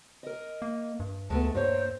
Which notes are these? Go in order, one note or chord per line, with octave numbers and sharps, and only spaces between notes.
A#4 D#5
A#3
G2
D2 G#3 A3 B3 A5
G2 A#2 C5 C#5